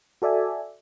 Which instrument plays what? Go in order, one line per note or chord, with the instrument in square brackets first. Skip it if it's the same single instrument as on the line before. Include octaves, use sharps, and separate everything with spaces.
[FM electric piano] F#4 A4 D5 E5 G#5